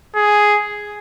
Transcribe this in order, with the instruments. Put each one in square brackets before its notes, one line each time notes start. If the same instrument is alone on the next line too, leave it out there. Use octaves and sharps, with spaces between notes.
[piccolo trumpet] G#4